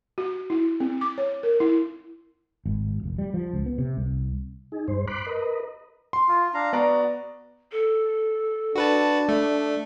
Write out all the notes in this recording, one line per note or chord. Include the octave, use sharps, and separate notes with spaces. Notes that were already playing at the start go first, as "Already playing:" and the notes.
F#4
E4
C4
D6
C#5
A#4
E4
G#1
F1
G3
F3
C#2
B3
C3
C2
D#4 G#4
G2 C5
B5 C6 D6 F#6
A#4 B4 D#5
C6
F4
D4 F5 A#5
B3 F#4 D5 A#5
A4
D4 F#4 B4 A5
A3